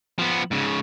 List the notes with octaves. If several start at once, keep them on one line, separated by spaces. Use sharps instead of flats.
F3 B3
G#2 C#3